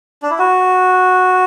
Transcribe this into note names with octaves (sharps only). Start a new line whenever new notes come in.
D4
E4
F#4